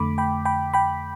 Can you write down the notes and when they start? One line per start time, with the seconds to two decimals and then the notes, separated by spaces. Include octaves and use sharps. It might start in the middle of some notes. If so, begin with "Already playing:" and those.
Already playing: F2 D3 A3 B5 D6
0.18 G5 B5
0.45 G5 B5
0.74 G5 B5